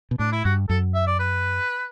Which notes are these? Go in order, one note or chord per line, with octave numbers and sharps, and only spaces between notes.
B2
A2 D4
E4
G2 F#4
F#2 A4
E5
D5
B4